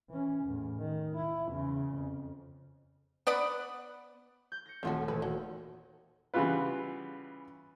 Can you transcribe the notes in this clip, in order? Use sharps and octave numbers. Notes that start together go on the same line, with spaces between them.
E3 C#4
E2 A2
D#3
E4
E2 C#3
F2
B3 D5 F#5 B5
G6
A#6 C#7
D#1 A3 C4 F4 F#4
E1 A#2 B4
F#3
C#3 E3 G3 B3 F4 B4